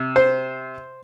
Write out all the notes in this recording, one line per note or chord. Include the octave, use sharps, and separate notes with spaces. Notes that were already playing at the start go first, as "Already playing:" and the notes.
Already playing: C3
C5